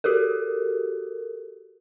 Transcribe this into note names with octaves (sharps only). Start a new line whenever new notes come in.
F#4 G4 A4 A#4